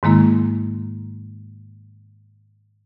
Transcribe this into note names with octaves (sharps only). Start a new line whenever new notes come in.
G#2 D#3 G#3 A#3 E4